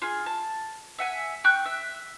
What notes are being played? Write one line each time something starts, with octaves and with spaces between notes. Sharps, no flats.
F4 G#4
A5
E5 F#5 G#5
G5 C#6 F#6 G6
E5